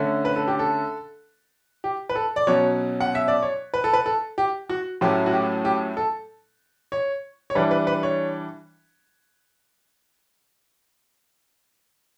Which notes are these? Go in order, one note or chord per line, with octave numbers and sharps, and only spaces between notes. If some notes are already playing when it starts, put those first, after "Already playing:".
Already playing: D3 A3 C#4
B4
A4
G4
A4
G4
B4
A4
D5
B2 F#3 C#4 C#5
F#5
E5
D5
C#5
B4
A4
B4
A4
G4
F#4
A2 F#3 A3 C#4 G4
F#4
G4
G4
A4
C#5
C#5
E3 G3 D4 B4
B4
B4
C#5